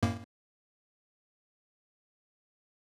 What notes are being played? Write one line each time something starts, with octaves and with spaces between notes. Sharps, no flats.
F#2 A2 A#3